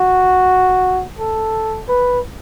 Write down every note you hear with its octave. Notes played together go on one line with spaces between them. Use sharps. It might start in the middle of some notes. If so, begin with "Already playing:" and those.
Already playing: F#4
A4
B4